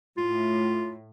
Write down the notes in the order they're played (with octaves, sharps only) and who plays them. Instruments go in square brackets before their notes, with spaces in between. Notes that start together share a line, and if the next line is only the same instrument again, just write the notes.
[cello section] A2 [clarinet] F4